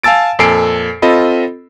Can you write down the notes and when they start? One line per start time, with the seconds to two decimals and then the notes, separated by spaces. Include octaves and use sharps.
0.03 F5 G#5 A5 E6 A6 D7
0.39 F2 A#2 A4 G#5 C7 D7
1.02 C4 F4 A4 D#5 B5